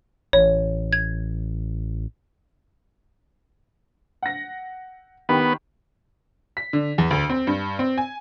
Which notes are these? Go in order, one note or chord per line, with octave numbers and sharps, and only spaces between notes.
A1 C#5
G#6
F#5 A#6
D#3 B3 G4 B5
B6
D3
E2
D2
C4
G2
C4
G#5